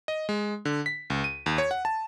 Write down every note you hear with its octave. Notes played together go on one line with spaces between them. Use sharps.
D#5
G#3
D3
B6
C#2
D#7
D#2
C#5
F#5
A5